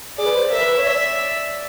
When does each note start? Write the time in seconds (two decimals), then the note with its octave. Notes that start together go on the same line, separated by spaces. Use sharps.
0.18 G#4 D5
0.26 B4
0.35 C5
0.51 A#4 E5
0.61 B4
0.78 C#5
0.86 D5 E5